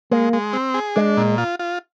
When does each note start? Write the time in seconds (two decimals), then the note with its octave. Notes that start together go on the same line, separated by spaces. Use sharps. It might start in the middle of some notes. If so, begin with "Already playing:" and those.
0.11 G#3 A#3
0.33 G#3
0.53 C4
0.74 G#4
0.96 G#3 D4
1.17 A#2
1.38 F4
1.59 F4